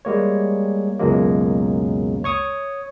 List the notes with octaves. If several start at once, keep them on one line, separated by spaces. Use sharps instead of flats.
G3 G#3 A#3 C#5
C#2 F#2 B2 F#3 G#3 A#3
C#5 C#6 D#6